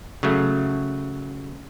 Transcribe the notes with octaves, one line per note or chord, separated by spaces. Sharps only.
C#3 F#3 A3